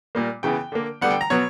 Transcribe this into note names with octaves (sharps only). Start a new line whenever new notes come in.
A#2 G3 A#3
C#3 E3 B3 G5
D3 A#3
D3 G3 B3 F#5
G5
A#5
B2 F#3 B3 C#5